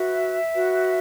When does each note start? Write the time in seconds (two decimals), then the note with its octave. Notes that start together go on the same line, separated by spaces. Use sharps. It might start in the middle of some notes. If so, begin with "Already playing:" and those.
Already playing: F#4 B4 E5
0.54 F#4 B4